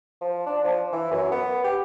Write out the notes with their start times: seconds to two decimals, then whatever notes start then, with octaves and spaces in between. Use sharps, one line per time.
0.21 F3
0.46 D4
0.64 F3
0.93 E3
1.11 F#2
1.32 B3
1.64 G4